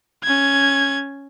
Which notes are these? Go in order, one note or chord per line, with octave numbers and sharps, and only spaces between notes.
C#4 G#6